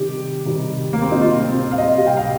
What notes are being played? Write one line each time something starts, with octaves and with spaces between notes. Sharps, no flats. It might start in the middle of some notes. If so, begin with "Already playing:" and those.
Already playing: C3 D#3 G3 G4
C3 D#3 G3
A#3
C4
D#4
C3 G3 F4
C4
C4
F5
D#5
C3 G3 F5
G5
F5